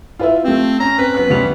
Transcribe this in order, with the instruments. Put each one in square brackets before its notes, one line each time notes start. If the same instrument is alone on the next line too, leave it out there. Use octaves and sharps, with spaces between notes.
[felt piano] E4 B4 E5 [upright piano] F4
[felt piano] A3 G4 [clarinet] C4
[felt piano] C#4 [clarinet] A#5
[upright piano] C4 [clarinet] B4
[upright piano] F#3 B3 F#6
D2 G3 F7